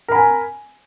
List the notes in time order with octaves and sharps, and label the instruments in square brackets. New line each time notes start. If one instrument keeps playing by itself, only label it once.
[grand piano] A#4
B5
G#5